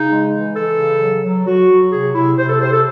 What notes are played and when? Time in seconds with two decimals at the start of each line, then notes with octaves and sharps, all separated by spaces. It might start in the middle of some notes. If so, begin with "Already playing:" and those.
Already playing: C#3 D#4
0.10 G#3
0.33 E3
0.55 E3 A4
0.78 C#3
1.00 F#3
1.24 F#3
1.46 F#3 F#4
1.69 F#3
1.91 C3 G#4
2.14 C3 E4
2.37 C3 C5
2.49 A4
2.60 C3 C5
2.72 A4